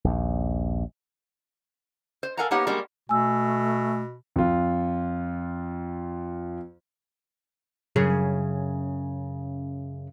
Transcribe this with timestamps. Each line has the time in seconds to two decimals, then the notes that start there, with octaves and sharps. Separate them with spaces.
0.04 A#1 D#2
2.23 C5
2.37 A4 A#4 F5 F#5 G#5 A#5
2.51 A#3 B3 D#4 G4 C#5 F#5
2.67 G3 G#3 A#3 D4 F#4
3.09 B2 A3 G#5 E6
4.36 F2 F4
7.96 F#2 C#3 G#4